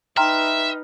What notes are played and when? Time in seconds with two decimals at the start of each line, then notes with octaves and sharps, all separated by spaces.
0.17 D#4 B4 E5 G5 A#5 C6 F6